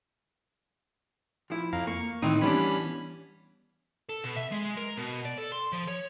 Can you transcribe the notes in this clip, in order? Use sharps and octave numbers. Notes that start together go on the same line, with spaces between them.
F3 E4
F2 F5 A#5
A#3 C#6
A2 D#3 E3 C4 D#4
E3 G3 B3 C#4 D4 B5
A4
B2
E5
G#3
A#4
B2
D5
A4
C6
F3
C#5